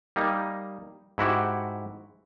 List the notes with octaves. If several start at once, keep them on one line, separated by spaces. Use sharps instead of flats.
G3 A#3 D#4
G#2 E4 F#4 G4